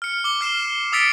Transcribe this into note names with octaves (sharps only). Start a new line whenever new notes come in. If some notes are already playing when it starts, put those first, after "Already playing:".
F6 C#7
D6 G7
F6 C7 E7
D#6 E6 A6 B6 C#7 D7